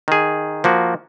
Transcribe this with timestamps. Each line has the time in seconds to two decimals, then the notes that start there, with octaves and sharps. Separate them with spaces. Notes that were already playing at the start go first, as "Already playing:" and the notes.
0.08 D#3 G#4
0.64 F3 A#3 F#4